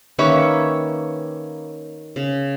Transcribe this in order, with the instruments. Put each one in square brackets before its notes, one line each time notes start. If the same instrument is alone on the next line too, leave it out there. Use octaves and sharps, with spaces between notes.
[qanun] D#3 A#3 C#4 [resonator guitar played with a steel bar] B4 C#5 E5
[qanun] C#3